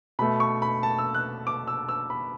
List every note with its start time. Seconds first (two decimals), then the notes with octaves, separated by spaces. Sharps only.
0.19 B2 A3 B5
0.40 C#6
0.62 B5
0.83 A5
0.99 E6
1.15 F#6
1.47 D6
1.67 E6
1.89 E6
2.10 B5